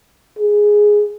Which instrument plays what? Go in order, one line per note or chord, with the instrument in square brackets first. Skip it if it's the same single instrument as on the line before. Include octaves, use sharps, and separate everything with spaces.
[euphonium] G#4